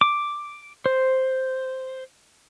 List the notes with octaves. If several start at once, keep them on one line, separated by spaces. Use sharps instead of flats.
D6
C5